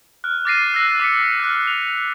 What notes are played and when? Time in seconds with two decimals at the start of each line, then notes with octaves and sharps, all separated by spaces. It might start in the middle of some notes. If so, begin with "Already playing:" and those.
0.24 F6 F#6
0.45 D6 F6 A6 A#6 C7 D#7
0.74 E6 F#6 A#6
1.00 D6 B6 C#7
1.40 F6 F#6
1.67 F7